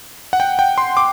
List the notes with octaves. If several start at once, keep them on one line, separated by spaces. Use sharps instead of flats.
F#5
G5
G5
C6
D6